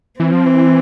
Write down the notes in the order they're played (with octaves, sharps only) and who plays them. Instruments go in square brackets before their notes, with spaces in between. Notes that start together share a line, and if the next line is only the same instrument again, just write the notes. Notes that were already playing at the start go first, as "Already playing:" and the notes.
[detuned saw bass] E3 [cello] C4
[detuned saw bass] F3
E3